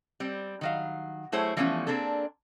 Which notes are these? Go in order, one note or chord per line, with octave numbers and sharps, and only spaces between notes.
G3 C4
D#3 F#3 F5
F#3 A3 E4 G#4 C5 C#5
E3 F3 G3 A3 B3 C#4
A#3 C4 D4 G#4 A4